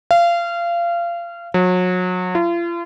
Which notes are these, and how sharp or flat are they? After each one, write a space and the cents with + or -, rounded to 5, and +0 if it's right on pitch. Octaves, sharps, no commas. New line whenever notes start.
F5 -25
F#3 -30
F4 -40